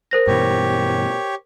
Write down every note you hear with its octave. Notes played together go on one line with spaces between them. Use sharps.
A#4 C5 A#6
G2 B2 E3 G4 C#5